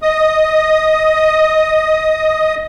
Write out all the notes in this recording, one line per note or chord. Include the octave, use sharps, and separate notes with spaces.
D#5 D#6